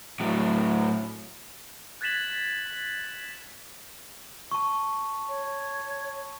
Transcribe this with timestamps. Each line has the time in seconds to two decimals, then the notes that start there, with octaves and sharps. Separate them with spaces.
0.20 A2 F#3
2.01 F#6 G#6 A6 B6 E7 F#7
4.51 A5 C#6
5.29 C#5